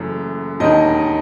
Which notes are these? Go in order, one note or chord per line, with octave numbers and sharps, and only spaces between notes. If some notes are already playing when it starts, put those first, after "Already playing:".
Already playing: F#1 F#2 E3 A3
E1 D#2 D#3 D#5